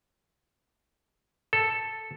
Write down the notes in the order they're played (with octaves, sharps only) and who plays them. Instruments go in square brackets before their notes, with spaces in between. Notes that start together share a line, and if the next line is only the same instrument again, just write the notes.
[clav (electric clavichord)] A4